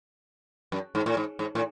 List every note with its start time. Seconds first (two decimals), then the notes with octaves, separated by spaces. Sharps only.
0.72 F#2
0.95 G#2
1.06 A2
1.17 G#2
1.39 G#2
1.55 A2